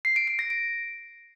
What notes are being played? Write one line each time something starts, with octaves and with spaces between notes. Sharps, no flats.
C7
D7
D7
A#6
D7